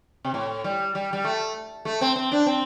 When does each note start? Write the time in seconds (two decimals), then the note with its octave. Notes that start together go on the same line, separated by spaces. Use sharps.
0.24 C3
0.34 A2
0.64 G3
0.95 G3
1.13 G3
1.24 A3
1.85 A3
2.01 C4
2.16 C4
2.32 D4
2.46 C4